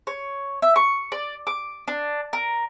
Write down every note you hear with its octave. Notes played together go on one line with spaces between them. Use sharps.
C#5
E5
C#6
D5
D6
D4
A#4